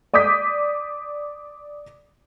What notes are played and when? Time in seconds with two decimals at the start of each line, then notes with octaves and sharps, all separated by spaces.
0.14 D5 D6 D#6 G6 B6